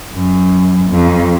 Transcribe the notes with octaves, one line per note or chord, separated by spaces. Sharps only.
F#2
F2